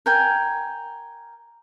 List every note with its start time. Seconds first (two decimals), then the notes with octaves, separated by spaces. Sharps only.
0.06 A#4 G5 G#5